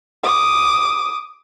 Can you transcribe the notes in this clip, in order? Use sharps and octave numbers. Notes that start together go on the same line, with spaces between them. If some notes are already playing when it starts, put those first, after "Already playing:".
D6 D#6